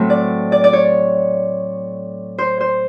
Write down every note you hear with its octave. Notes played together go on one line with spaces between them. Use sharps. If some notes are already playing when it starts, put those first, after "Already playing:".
Already playing: A2 F#3 A3 C4
D5
D5
D5
C#5
C5
C5